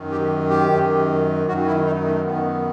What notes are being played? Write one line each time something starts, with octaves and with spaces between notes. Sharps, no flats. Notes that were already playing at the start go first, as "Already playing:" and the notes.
Already playing: F#2 D#3
G4
G4
F#2 D#3
F#2 D#3 F#4
E4
D#4
A3
F#2 D#3 B3